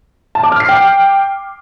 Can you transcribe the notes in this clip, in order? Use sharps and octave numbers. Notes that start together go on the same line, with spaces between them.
A5
D6
F6
C7
G5